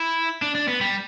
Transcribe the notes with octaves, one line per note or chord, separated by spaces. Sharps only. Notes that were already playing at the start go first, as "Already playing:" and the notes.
Already playing: E4
D4
D4
B3
G3